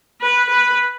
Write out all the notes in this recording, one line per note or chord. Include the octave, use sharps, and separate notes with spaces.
B4
B4